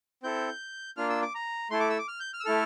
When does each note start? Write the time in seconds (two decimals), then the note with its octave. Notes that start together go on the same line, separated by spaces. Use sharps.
0.23 C4 E4 A4 G6
0.97 A#3 D4 F4 F6
1.10 E6
1.22 D6
1.35 A#5
1.71 A3 E4 A4 C6
1.80 D6
1.90 E6
1.98 D6
2.08 F6
2.20 G6
2.34 F6
2.40 E6
2.45 A3 E4 A4 F6